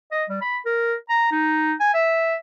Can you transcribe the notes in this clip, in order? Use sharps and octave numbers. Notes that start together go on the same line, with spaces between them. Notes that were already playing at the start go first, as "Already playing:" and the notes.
D#5
G3
B5
A#4
A#5
D#4
G#5
E5